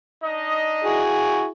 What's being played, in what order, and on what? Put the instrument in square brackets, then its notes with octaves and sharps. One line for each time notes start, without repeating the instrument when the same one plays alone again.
[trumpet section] D4 D#4 D#5
[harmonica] E4 F#4 G#4